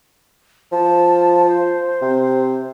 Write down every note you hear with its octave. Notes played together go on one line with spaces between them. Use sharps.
F3 A5
C5
C3